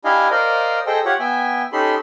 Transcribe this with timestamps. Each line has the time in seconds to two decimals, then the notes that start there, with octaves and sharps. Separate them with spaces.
0.05 D4 E4 G4 D#5 F5 G#5
0.31 A#4 C5 D5 D#5 F5
0.86 G#4 A4 C5 D#5 G5
1.05 F4 G4 C#5 F#5
1.19 B3 E5 G5 G#5
1.72 C#4 D#4 G4 A4 B5 C6